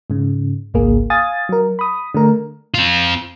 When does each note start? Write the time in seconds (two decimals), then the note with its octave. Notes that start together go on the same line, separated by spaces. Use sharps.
0.10 G#2 C#3
0.74 G#1 C#2 A#3 G#4
1.10 F5 G#5 D#6 A6
1.49 F#3 A#4
1.79 B5 D#6
2.14 D3 A3 A#4
2.74 C4 F4